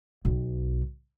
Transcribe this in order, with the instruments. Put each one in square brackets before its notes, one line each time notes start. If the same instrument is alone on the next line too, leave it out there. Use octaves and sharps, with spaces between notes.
[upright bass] B1 B2